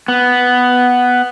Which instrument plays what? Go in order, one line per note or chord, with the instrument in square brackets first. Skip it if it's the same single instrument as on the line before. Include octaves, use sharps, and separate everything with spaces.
[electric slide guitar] B3